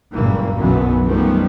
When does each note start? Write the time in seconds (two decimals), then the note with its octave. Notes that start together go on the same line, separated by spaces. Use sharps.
0.12 F#1 C#2 G2 A#2 E3 A#3
0.54 B1 F#2 D3 E3 B3
1.04 F#2 D#3 F3 G3 A3 B3